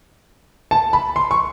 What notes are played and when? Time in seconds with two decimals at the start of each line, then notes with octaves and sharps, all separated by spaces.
0.71 A5
0.93 B5
1.16 C6
1.31 C#6